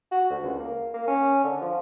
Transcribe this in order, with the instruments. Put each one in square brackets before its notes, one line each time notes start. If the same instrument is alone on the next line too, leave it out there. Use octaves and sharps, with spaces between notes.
[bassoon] F#4
D2
C#2
A#3
A#3
C#4
D3
F3